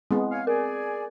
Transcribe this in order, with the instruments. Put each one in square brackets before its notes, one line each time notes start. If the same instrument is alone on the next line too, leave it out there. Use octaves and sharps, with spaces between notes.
[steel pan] G#3 B3 [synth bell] C4
[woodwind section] C#5 F5 G#5
[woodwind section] G#4 D5 G#5 [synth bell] A#4